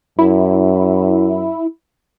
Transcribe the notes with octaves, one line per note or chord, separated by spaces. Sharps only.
F#2 E4